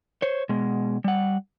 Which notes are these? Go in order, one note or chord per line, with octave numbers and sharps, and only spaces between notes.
C5 C#5
B2 G#3
G3 F#5